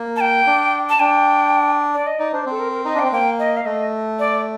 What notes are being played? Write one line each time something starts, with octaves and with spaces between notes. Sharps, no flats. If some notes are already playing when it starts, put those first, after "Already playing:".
Already playing: A#3
A5
G5
D4
A5
D4 G5
D5
D#5
D#4 D5
D4 C5
C4 A4
A#4
A#4
D#4 D#5
D4
G5
C4
A#3 G5
D#5
F5
A3 D#5
D5